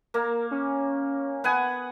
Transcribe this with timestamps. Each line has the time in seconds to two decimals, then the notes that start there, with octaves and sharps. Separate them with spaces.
0.14 A#3 A#4
0.51 C#4
1.44 B3 F#5 G#5